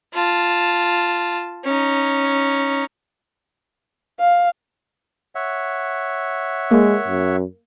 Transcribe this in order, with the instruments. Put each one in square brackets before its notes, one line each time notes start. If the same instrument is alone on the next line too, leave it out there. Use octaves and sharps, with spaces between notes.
[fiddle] F4 A5
C#4 D#4
[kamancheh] F5
[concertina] C#5 E5 F#5
[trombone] G#3 [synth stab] A#3
[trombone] F#2